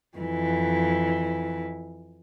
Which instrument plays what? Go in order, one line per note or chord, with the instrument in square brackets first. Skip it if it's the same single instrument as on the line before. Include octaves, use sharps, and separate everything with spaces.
[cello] F2 E3